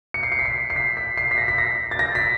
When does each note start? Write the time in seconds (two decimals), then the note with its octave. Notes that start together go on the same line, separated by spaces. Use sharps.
0.14 C#7
0.23 C7
0.32 C#7
0.39 B6
0.45 C7
0.70 C7
0.76 B6
0.97 B6
1.17 C7
1.31 B6
1.38 A#6
1.48 B6
1.58 A#6
1.91 A6
1.99 A#6
2.15 B6